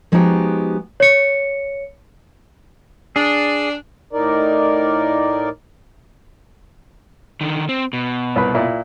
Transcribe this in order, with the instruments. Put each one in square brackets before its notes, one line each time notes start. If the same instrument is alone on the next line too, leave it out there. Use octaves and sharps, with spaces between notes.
[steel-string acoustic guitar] F3 G#3 B3 D#4 F#4 G4
[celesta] C#5 C#7
[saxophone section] D4 [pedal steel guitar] G#4
[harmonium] A2 D#4 A#4 D5
[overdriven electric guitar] D3 D#3
C4
B2
[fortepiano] C2 B4
A#2 E4